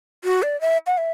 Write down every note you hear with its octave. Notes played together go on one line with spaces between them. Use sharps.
F#4
D5
E5
F#5
E5